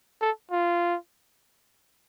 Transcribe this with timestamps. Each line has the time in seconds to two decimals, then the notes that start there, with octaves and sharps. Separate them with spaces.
0.22 A4
0.51 F4